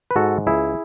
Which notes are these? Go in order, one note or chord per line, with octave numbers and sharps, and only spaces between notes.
B4
G#2 F#4 A4
C#2 E4 G#4